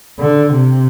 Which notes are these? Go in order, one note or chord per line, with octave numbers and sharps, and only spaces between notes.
D3
C3